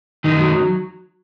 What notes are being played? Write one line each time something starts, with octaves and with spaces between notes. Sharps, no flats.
F#2 D#3 D#4
F#3